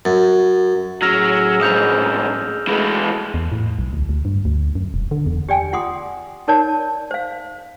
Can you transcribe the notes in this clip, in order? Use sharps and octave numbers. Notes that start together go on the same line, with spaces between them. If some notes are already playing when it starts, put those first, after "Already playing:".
F#2
A2 F#3 C#4 G#4 E6 F6 A#6
F2 G#2 D#6 G6 F7
E3 G#3 A3 E4
E2
A2
B1
D2
D2
G2
D2
F#2
E1
D3
E2
G4 D5 G5 G#5
F4 F#5 C6 D6 D#6
D#4 A#4 C#5 D5 A5
C5 F5